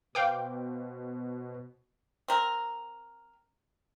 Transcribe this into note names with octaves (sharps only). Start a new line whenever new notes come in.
B2 B4 C5 F5 G5 D6
C4 A#4